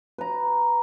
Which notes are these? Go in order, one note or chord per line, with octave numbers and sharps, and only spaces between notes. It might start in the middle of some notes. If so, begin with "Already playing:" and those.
B4 A#5